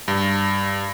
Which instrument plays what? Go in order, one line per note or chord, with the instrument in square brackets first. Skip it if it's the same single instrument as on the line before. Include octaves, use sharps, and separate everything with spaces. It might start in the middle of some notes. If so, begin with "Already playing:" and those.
[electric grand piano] G2